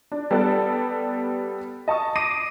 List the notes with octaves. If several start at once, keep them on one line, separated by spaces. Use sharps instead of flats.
D4
G3 B3 A4 D5 A5 F#6
D#5 A5 C#6 D#6
D6 D#6 A#6 C7 D7 D#7